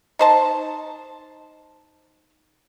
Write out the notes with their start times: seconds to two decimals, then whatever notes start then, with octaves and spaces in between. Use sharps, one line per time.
0.19 D#4 C5 A5